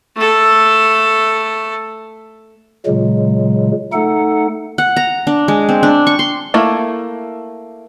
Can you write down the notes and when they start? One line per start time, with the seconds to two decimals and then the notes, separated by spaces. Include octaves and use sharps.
0.16 A3 A4
2.86 A#2 C#3 F#3 G#3
3.93 A3 D#4 A4 F#5
4.78 F#5
4.96 A#5
5.27 D4
5.48 G#3
5.69 C4
5.83 D4
6.07 C#6
6.19 C6
6.54 A3 A#3 E4